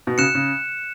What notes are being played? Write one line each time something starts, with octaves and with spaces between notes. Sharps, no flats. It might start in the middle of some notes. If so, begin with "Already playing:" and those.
B2
C#3 F#6 C#7 E7
C#3